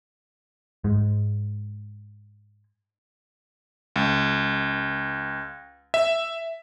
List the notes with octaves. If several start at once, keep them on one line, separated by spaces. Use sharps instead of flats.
G#2 G#3
C#2
E5